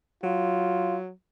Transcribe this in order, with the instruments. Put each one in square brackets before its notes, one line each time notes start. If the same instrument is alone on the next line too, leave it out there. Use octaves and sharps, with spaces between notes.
[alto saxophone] F#3 [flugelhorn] F4